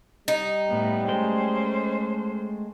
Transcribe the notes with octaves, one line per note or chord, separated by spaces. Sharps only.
G3 D#4
A2 B3
G#3 A3 C#4 C5 G5